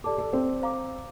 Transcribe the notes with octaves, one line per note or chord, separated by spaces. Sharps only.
G4 A4 D5 A5 D6
A4
C4
C5 F5 A#5 D6